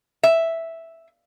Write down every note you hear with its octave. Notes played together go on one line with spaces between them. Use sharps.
E5